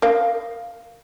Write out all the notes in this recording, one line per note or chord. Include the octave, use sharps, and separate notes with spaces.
A#4 D#5 F5